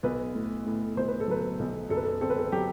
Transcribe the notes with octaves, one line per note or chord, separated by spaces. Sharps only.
B1 B4
A2
A2
B1 C5
B4
A4
F#3 B4
B1
F#2 A4
B4
A4
C4 A4
B4
A4
F#3 G4